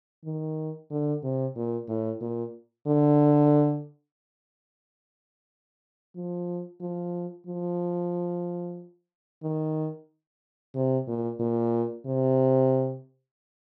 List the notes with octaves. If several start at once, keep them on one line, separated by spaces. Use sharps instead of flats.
D#3
D3
C3
A#2
A2
A#2
D3
F3
F3
F3
D#3
C3
A#2
A#2
C3